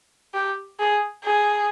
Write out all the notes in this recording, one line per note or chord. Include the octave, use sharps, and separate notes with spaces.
G4
G#4
G#4